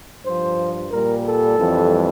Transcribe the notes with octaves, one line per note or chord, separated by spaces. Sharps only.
G2 F3 C5
A#2 G3 A#4
A4
F2 E3 G3